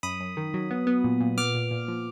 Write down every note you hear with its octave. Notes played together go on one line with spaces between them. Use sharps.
F#2 B5 D#6
F#2
D#3
F#3
B3
B3
A#2
A#2
B3 D6 F6
A#2
A#2
F3